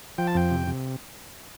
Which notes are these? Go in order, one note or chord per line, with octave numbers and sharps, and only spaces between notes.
F3 G5
A5
F2 G5
C3
C3